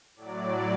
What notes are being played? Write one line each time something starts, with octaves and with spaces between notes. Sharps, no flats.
A2 F#3 D5